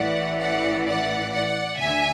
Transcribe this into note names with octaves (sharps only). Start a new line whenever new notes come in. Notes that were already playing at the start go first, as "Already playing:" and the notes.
Already playing: A1 A2 E3 D5 F#5
D5 F#5
D5 F#5
D5 F#5
D2 D3 E5 G#5